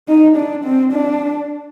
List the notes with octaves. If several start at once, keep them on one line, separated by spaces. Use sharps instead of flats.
D#4
D4
C4
D4